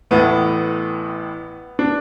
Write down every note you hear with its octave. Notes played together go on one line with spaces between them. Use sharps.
A1 A2 A3 B3
D4